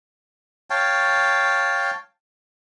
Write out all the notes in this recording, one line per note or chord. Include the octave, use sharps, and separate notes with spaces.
C#5 F5 G5 A5